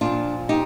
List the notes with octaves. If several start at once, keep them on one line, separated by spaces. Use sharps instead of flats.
A#2 F3 D4 F4
D#4 G4